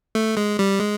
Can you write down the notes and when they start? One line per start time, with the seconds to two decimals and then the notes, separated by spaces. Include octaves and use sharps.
0.15 A3
0.37 G#3
0.59 G3
0.80 G#3